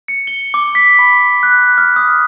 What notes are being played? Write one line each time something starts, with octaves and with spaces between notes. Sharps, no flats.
C#7
G7
D6
B6
B5
F#6
F6
D#6